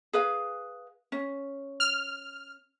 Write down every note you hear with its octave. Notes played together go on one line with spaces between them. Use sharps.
G#4 B4 F5
C#4
F6